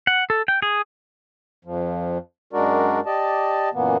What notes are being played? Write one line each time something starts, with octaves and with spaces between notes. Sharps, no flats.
F#5
A4
G5
G#4
F2 F3
F#2 G#3 D4 F#4 A#4 D5
G4 D5 D#5 A5
F#2 A#2 E3 A#3 B3